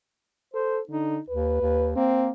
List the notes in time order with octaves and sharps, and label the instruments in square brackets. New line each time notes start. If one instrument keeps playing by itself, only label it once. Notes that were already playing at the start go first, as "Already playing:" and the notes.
[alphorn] A4 [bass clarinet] C5
[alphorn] D3 [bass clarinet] D#4
[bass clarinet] D#2 [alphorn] B4
[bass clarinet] D#2
[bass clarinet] A#3 [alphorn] C4